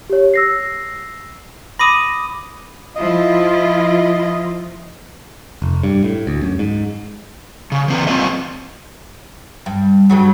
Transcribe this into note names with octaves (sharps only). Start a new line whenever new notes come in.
G4 C#5
E6 A#6 C7
B5 D6 D#6 A#6 D#7
F3 E4 F4 D#5
F1
G2
A2
D2
F#2
G#2
C#3
E3 C4 B4
F#3 C4 D#4 F4 B4 D#5
G2
G2 C#3 F#3